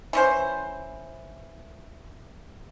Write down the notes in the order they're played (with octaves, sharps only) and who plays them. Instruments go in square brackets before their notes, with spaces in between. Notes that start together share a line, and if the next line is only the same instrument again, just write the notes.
[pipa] E3 C#4 C5